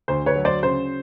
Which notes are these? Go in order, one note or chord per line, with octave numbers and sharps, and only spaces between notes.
D2 C5
B4 C#5
F#3
C5 D5
C#3 C5